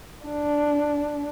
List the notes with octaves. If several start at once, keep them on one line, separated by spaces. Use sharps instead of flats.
D4